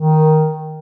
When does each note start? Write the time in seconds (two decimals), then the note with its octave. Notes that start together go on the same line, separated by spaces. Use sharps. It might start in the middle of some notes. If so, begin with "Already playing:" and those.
Already playing: D#3